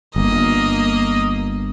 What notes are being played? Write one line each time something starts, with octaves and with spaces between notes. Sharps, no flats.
G1 A#3 D#5